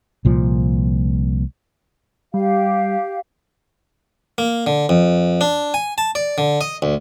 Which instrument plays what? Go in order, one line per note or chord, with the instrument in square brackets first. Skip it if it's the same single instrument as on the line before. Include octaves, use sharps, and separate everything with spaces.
[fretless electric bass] C2 A#2 F3
[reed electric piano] G3 [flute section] G4 F5
[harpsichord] A#3
D3
F2
D4
G#5
A5
D5
D3
D#5
D2